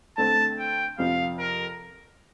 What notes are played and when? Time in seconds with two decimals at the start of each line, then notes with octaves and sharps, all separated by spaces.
0.17 D3 A3 C4 A5
0.59 G5
0.98 F2 C3 F3 C4 F5
1.39 A#4